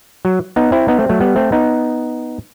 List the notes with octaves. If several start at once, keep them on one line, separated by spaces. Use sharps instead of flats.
F#3
B3 D#4
C4 E4
B3 D#4
A3 C4
F#3 A3
G3 B3
A3 C4
B3 D#4